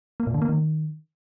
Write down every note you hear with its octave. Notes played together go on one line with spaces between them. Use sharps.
A#3
A#2
D3
A#3
D#3